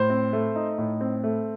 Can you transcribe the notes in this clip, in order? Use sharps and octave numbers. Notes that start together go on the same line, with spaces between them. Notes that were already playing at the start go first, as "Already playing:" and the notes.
Already playing: A2 C5
C4
A3
D#4
A2
C4
A3